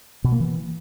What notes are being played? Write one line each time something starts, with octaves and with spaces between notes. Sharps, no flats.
B2
A#3
E3